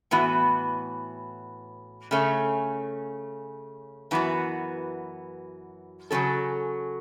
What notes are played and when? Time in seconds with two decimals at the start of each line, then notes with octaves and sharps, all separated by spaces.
0.11 A2 E3 B3 F#4
2.11 C#3 A3 C#4
4.11 F#2 E3 B3 F#4
6.11 C#3 F#3 C#4 A4